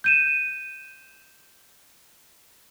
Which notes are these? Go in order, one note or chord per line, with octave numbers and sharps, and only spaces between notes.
G6 D#7 E7